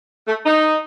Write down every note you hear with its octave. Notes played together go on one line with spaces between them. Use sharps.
A3
D#4